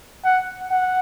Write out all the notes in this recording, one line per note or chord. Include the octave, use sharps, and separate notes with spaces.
F#5
F#5